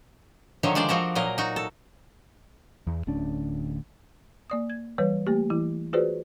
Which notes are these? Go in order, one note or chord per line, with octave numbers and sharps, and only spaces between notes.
D3 D#3 F3 F#3 C#5
G#3 D4 C5 D5
F3 F#4 A4 A#4
A#2 F#3 A#4 D#5
D#4 F#4
A4
E2
D1 D2 C#4 D4
A#3 D5 D#6
G#6
E3 G3 B4 C#5
A3 A#3 G4
E3 E4
F4 F#4 G#4 B4 C5 D5